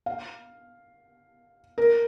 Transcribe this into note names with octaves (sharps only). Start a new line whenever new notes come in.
F5
A#4